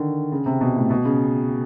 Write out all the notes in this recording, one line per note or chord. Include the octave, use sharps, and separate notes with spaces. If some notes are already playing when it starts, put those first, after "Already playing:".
Already playing: D3 D#3
C#3
C3
B2
A2
B2
C#3